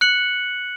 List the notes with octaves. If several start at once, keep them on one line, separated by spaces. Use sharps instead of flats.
F#6 C#7 F#7